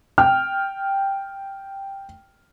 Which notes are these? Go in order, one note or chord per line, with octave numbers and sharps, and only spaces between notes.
G5 F6